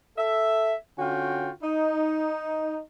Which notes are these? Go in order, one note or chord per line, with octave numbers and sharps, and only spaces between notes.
A4 E5
D3 C#4 F4 F#4 G5
D#4